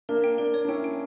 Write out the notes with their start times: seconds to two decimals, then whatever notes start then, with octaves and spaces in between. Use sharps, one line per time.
0.09 A#3 D4 A#4
0.24 G5
0.38 A#3 D4 A#4
0.54 C#5
0.65 D4
0.68 C#4 E4 G5
0.84 G5